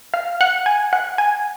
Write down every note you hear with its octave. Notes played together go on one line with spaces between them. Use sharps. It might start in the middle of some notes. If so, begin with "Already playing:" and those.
F5
F#5
G#5
F#5
G#5